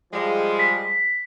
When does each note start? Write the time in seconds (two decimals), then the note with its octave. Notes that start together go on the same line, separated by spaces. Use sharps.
0.13 F3 G3 G#3
0.59 B6